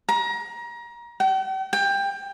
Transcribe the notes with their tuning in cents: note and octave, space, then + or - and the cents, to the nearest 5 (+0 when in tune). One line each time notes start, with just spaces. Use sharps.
A#5 +30
G5 -45
G5 +20